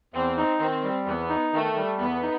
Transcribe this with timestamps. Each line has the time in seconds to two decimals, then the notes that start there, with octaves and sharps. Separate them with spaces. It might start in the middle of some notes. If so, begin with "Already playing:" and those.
0.14 E2 C4
0.37 D#4
0.60 D#3 C4
0.83 G3
1.06 E2 B3
1.29 D#4
1.53 D#3 A3
1.77 G3
1.99 E2 B3
2.22 D#4